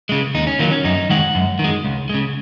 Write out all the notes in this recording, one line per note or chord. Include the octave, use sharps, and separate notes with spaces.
C#3 G#3
D#2 D#4
C#4
D#3 F#3 A#3
C#4
F#2 D#4
D#3 G#3 F#5
F#2
D#3
G#3
C#2
C#3 G#3